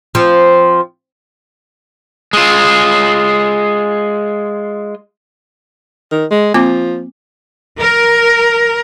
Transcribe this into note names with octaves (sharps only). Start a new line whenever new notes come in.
F3 C4
G#3 F4
D#3
G#3
F3 A#3 C4 D6
A#4